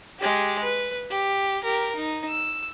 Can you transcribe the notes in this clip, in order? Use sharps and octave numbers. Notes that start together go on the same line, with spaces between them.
G#3 G4
B4
G4
G4 A#4
D#4
E6